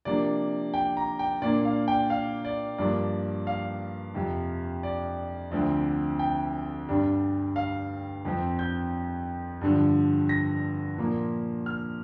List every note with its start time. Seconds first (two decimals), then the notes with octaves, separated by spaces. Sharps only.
0.05 C3 F3 A#3 D4 D5
0.74 G5
0.97 A#5
1.19 G5
1.42 A#2 A#3 D4 D5
1.65 F5
1.88 G5
2.10 F5
2.45 D5
2.78 G2 F3 A#3 D4 D5
3.47 F5
4.15 F2 C3 F3
4.83 D5
5.51 D2 D3 F3 C4
6.19 G5
6.89 G2 G3 D4
7.56 F5
8.25 F2 F3 C4
8.59 G6
9.61 G2 D3 F3
10.29 A#6
10.98 A#2 F3 A#3
11.66 F6